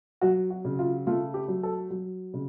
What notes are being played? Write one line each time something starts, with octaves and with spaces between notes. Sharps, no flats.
F#3 F#4
F#4
C#3
F4
A3 F4
G4
F#3
A4
F#3
C#3